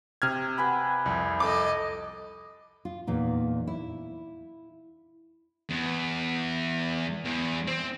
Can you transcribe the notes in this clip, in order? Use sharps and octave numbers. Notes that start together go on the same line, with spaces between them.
C3 F6 G#6
B4 G#5 B5
C2 F2
A4 D#5 D6
F4
E2 A#2 D#4
E4
E2
E2
C4